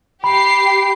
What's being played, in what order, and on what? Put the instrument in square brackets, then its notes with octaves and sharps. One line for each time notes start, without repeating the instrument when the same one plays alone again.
[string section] G4 C7 [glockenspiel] B5